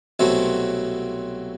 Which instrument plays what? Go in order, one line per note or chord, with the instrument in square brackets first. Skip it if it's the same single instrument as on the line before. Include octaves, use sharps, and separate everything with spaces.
[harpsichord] C2 B2 F#3 A3 C4